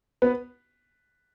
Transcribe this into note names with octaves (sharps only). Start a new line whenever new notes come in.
B3 B4